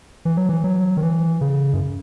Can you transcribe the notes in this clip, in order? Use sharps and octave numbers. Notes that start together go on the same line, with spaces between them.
E3
F#3
E3
F#3
D#3
E3
C#3
F#2